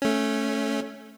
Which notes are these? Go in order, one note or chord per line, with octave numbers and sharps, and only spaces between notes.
A3 C#4